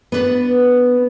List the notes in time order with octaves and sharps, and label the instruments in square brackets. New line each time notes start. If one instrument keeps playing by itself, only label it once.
[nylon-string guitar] B3 D4 B4 D5